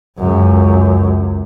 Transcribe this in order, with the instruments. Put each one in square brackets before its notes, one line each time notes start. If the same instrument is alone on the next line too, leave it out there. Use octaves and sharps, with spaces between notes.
[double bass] C#2 F#2